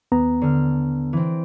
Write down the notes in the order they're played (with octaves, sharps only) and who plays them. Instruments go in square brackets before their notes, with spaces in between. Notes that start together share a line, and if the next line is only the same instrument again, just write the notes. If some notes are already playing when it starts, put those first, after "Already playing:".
[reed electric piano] D#2 B3 A#5
[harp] D3 F6
E3 C4